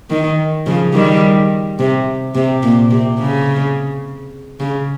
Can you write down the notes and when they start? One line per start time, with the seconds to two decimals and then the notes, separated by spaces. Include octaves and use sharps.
0.10 D#3
0.66 C#3 F3
0.93 D#3 G3
1.79 C3
2.35 C3
2.63 A#2
2.91 C3
3.19 C#3
4.60 C#3